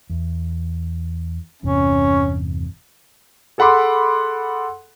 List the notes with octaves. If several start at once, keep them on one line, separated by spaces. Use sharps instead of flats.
E2
G1 E2 C3 C#4
G#4 A4 F#5 B5 C6 D6